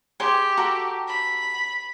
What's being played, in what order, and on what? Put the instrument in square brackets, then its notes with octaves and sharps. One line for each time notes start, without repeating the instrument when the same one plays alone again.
[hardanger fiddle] G4 [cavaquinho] G#4 C6
[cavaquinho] F#4 A4 A#5
[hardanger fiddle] B5